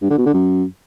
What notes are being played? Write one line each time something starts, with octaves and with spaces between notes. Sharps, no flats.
G2
D3
B2
D3
F#2